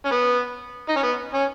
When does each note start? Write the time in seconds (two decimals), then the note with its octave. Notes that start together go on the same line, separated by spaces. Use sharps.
0.05 C#4
0.11 B3
0.89 D#4
0.96 C#4
1.03 B3
1.34 C#4